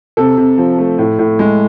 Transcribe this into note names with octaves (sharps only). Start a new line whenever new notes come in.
C3 A4
C3
F3
A3
A2
A2
G#3